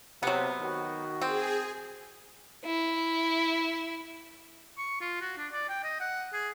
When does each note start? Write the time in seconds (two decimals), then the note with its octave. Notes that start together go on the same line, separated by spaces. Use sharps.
0.23 C3 F#3 B3
0.61 D#3 F#4
1.21 C4 G#4
2.65 E4
4.78 C#6
5.01 F4
5.21 F#4
5.38 D4
5.52 D5
5.69 G5
5.84 D#5
6.00 F#5
6.33 G#4